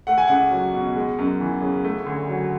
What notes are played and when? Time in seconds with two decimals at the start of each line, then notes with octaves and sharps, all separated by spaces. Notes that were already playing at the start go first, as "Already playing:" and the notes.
0.07 A3 F#5
0.18 G#5
0.28 C#2 F#5
0.51 F#3
0.74 B2
0.96 G#3
1.18 F#2
1.41 E3
1.62 C#3
1.84 A3
2.06 D2
2.29 F#3